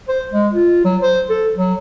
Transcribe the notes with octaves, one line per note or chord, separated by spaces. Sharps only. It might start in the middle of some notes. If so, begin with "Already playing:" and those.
C5
G#3
F4
F#3
C5
A4
F#3